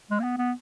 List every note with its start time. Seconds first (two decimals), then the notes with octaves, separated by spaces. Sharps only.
0.10 G#3
0.20 A#3
0.23 B3
0.38 B3